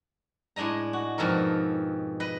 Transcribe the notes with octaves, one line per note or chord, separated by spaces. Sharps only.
A2 G#3 D4 D#5 A#5
F#4
F2 G#2 B2 A4 A#4
B4 D#5